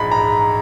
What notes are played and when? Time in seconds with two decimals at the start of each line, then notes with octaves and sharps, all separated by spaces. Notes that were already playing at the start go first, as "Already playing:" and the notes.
Already playing: A#1 G#2 F3 G#3 A#5 B5
0.11 A#5